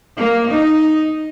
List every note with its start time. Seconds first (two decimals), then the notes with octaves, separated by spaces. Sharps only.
0.17 A#3
0.53 D#4